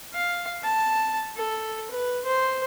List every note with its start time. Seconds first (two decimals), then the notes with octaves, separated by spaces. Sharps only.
0.14 F5
0.64 A5
1.36 A4
1.91 B4
2.24 C5